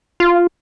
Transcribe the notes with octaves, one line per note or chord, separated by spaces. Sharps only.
F4